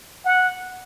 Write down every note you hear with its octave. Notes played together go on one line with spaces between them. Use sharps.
F#5